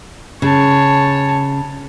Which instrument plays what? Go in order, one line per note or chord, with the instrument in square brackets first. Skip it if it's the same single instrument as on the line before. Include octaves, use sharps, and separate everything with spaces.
[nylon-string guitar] C#3 [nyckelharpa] C#5 A5